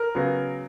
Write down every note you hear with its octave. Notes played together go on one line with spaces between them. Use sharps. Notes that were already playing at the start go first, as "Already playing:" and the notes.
Already playing: A#4
C#3 F#3 B3